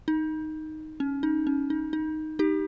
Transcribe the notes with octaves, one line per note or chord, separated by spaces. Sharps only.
D#4
C#4
D#4
C#4
D#4
D#4
D#4 G4